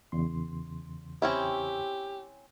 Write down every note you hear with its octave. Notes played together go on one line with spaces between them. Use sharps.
E2 C#3 C6
C4 C#4 E4 G4